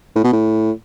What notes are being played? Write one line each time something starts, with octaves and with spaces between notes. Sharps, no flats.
A2
B2
A2